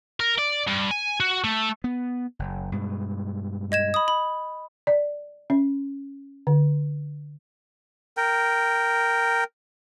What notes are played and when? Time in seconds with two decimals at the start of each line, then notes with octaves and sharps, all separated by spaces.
0.20 A#4
0.38 D5
0.67 G2
0.91 G#5
1.20 F#4
1.44 A3
1.84 B3
2.39 F#1
2.72 G2 B2 G#3
3.72 D#5 G#6 E7
3.94 B5 D#6
4.08 B5
4.87 D5
5.50 C#4
6.47 D3
8.17 A#4 G5